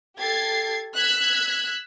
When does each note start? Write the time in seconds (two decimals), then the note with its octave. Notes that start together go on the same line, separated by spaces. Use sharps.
0.17 G4 A4 G#6 A6 C7
0.96 E6 F#6 G#6 B6